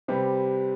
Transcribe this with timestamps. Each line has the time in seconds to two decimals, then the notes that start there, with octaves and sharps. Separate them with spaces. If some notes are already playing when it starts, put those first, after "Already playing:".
0.08 C3 G3 C4 G4 B4